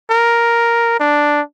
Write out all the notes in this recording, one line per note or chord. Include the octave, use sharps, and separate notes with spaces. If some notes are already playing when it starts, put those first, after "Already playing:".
A#4
D4